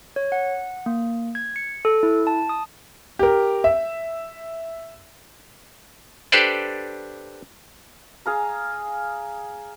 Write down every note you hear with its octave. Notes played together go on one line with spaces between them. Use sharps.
C#5
F#5
A#3
G#6
C#7
A4
E4
A5
D#6
G4 A#4
E5
D4 G4 A4 B4 C5 D5
G#4 F5 A#5